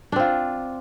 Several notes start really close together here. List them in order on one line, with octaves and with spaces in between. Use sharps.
D4 C4 F4